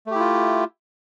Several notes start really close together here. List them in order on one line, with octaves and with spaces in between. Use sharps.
A3 G4 E4 F4